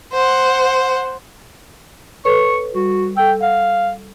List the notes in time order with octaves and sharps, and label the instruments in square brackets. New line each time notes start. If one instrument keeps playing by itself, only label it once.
[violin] C5 F#5
[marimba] A4 B4 C#5 [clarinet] C#6
[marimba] G3 [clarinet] F#4
[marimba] A4 E6 [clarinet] G5
[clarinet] F5 [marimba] F#5